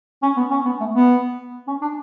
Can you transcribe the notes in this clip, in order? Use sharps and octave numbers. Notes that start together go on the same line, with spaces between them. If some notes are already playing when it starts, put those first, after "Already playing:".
C#4
B3
C#4
B3
A3
B3
C#4
D4